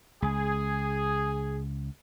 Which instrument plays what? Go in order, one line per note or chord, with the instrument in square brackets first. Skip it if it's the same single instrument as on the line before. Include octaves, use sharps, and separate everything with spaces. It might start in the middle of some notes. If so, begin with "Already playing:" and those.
[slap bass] C#2 [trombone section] G#4